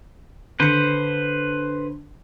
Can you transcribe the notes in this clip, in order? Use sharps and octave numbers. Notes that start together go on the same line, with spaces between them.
D3 B4 C5 C#7